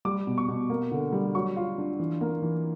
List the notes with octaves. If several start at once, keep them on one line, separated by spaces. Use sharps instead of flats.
G3 D6
B2
C#6
B2
A#3
D3
G3
F#3 C#6
F4
D4
E3
A#3
E3